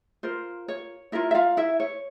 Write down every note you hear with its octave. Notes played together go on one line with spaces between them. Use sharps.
F4 A#4 C5
C#5
E4 F4 A#4 E5
E5
F4 F5
E4 E5
C#5